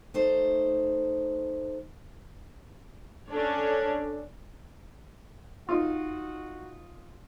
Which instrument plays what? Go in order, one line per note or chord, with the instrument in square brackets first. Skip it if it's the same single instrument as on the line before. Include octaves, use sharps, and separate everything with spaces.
[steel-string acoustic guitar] A3 D#4 C5
[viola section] C#4 D4 A4 C#5
[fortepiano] D#4 F4 [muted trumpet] F#4